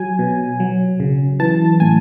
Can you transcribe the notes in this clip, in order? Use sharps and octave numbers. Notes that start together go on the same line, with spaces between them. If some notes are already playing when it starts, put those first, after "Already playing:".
Already playing: F#3 G#5
B2
F#3
C#3
E3 A5
A2 G#5